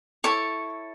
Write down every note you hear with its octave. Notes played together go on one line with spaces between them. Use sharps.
E4 A4 C#5 C#6